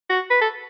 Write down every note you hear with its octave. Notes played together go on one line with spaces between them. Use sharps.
F#4
B4
A4